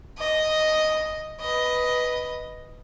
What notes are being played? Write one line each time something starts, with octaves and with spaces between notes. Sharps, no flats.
D#5
B4 D#5